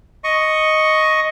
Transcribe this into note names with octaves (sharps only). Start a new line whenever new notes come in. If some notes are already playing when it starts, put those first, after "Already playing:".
D#5 C#6